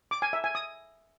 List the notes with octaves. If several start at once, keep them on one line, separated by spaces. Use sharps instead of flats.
D6
G#5
E5
G#5
D#6